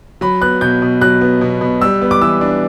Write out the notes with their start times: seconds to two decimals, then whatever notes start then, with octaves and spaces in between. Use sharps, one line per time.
0.21 F#3 B5
0.42 B3 F#6
0.61 B2 G6
0.82 B2
1.01 F#3 F#6
1.21 B3
1.41 B2
1.61 B2
1.81 G3 E6
2.01 B3
2.11 D6
2.21 E3 E6
2.41 D4